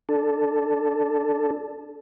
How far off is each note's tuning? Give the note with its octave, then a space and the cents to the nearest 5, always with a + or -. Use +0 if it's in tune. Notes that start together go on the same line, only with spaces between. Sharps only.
D4 +0 A4 -5